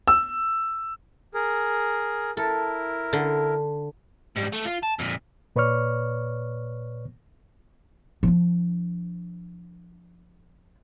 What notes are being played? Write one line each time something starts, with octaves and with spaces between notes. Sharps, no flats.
E6
G#4 A#4
E4 A4 A#4
D3
G#2 G3
A3
F4
A5
F2 A#2
A#2 B4 C#5 D5 C#6 F6
F3 D4